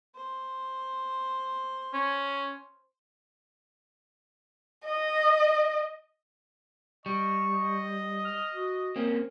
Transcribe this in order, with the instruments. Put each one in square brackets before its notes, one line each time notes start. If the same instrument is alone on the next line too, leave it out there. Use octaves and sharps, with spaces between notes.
[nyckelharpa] C5
[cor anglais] C#4
[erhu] D#5
[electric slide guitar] G3 [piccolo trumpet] D#5 [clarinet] C#6
[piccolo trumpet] D#5
[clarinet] F6
F#4
[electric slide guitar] A#3 C4 C#4 [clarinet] A#4